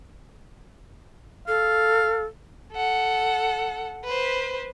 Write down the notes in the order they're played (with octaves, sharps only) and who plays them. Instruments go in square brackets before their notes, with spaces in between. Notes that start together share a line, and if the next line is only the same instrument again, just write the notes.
[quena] A4 [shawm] F5
[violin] A4 F#5
B4 C5